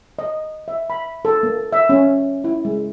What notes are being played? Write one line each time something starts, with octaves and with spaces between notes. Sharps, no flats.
D#5
E5
B5
A4
A#3
E5
C#4
E4
G#3